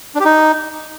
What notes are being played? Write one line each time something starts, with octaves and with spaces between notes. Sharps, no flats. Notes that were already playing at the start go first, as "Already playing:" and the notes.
D4
G4
D#4